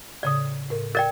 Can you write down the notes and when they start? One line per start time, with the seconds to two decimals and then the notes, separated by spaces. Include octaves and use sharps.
0.23 A2 C#3 D5 D#6
0.70 A2 A#4
0.95 A#4 D5 G5 A6